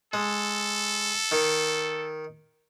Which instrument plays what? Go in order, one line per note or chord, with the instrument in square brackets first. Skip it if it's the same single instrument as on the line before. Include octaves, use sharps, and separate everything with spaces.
[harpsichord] G#3 [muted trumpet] A4
[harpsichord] D#3